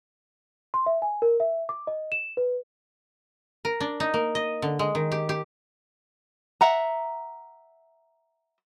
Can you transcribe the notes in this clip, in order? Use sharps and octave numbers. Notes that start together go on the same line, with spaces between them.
C6
E5
G#5
A#4
E5
D6
D#5
E7
B4
A#4
D4
D#4
A#3
D#5
D3
G#3
D#3
G4
G4
E5 F#5 A#5